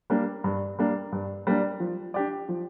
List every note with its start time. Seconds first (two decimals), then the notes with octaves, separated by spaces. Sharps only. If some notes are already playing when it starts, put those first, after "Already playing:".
0.10 G3 A#3 D4
0.44 G2
0.79 G3 A#3 D4
1.12 G2
1.47 G3 A#3 D4
1.80 F3
2.14 D4 G4 D5
2.49 F3